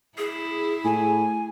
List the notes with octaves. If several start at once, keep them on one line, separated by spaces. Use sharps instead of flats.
E4 G#4
A2 G#5